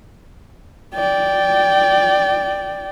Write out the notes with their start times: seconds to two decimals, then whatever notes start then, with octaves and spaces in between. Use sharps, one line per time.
0.95 D5 G5